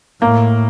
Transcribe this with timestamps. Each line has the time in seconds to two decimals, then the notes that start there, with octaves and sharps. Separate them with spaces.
0.22 A2 A#3